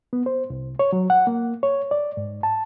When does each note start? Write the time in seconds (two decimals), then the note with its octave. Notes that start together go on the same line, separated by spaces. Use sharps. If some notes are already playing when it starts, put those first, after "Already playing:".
0.13 B3
0.26 C5
0.50 C2
0.79 C#5
0.93 F#3
1.10 F#5
1.27 A#3
1.63 C#5
1.91 D5
2.17 G#2
2.43 A5